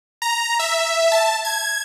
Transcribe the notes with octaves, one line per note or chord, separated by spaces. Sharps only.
A#5
E5
A5
G#6